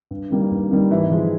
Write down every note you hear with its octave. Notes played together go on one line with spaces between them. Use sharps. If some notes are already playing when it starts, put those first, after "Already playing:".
G2
D#3 G3 A#3
G2
D#3 G3 A#3
G#2 E3 E4
F3 G#3